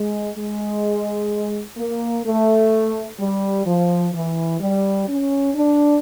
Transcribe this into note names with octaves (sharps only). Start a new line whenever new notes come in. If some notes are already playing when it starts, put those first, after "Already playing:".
Already playing: G#3
G#3
A#3
A3
G3
F3
E3
G3
C#4
D4